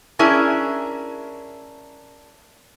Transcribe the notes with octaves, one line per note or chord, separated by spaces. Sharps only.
C#4 D4 E4 G#4 A#4